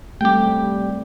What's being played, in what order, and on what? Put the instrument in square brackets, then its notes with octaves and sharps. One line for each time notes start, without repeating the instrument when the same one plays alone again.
[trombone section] G3 [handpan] A3 C4 [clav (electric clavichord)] G4 G5